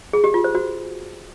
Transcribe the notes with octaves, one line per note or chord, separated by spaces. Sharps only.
G#4
G4
F4
C5
F#4